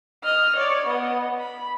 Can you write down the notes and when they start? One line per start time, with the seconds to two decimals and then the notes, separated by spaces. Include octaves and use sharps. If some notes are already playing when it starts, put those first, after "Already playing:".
0.23 D#5 F6
0.55 C#5 D5
0.86 B3 D#5
1.39 B5